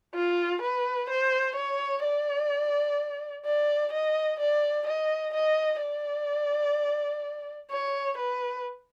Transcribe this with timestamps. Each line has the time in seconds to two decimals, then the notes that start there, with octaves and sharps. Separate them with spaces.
0.15 F4
0.62 B4
1.10 C5
1.56 C#5
2.04 D5
3.45 D5
3.93 D#5
4.40 D5
4.87 D#5
5.34 D#5
5.81 D5
7.71 C#5
8.18 B4